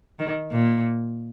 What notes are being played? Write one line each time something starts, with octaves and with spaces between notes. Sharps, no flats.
D#3
A#2